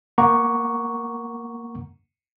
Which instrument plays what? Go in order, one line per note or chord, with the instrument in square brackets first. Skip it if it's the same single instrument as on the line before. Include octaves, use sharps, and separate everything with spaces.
[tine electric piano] A#3 F#5 A#5 C#6 D6